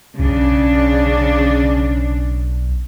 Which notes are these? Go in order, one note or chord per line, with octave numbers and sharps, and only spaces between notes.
B1 C#3 D4